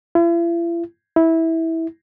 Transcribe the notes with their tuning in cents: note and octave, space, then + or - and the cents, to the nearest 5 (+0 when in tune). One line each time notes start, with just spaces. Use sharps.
E4 +45
E4 -15